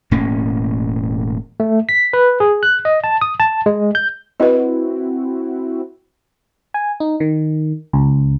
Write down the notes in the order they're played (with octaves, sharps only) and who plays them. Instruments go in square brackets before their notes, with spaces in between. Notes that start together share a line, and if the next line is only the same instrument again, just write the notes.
[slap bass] E1 A2 A#3 C#4
[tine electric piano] A3
B6
B4
G#4
F#6
D#5
A5
D#6
A5
G#3
G6
[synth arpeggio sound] C4 E4 F#4 [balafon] B4 D#5
[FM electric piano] G#5
D#4
D#3
C#2